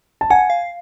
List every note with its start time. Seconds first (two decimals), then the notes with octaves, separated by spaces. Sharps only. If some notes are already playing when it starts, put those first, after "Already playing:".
0.21 A5
0.30 F#5 G#5
0.50 F5